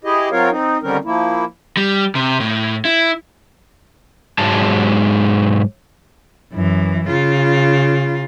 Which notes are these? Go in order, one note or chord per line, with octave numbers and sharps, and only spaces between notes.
E4 G4 G#4 D#5
F#3 C4 F4 A#4 C#5 F5
C4 D#4
D3 D#3 G3 C4 C#4 A#4
F3 A#3 E4
G3
C3
A2
E4
G#2 F#3 G#3 A5
F#2 E3
C#3 F4